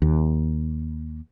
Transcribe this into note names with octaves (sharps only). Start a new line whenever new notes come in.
D#2